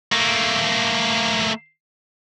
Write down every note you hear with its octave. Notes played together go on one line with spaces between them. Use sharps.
A3 A#3